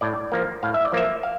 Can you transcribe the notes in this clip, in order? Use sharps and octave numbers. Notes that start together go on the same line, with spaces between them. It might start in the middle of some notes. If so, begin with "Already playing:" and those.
A2 D5
F3 A#3
A2 F5
E5
D5
F3 A#3 E5
F5